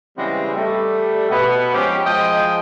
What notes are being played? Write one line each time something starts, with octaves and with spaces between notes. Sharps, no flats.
C#3 E3 G3 G#3 B3 C4
G3 A3
B2 B3
F3 G#3 C4 C#4 G4
F3 G#3 D#5 G5